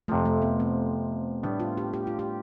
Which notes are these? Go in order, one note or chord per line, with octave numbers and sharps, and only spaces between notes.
F2 C3 F3 A3
A3
B3
C4
A2 G3 B3 D4
F4
G4
G4
F4
G4